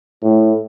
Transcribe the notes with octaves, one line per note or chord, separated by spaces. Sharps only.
A2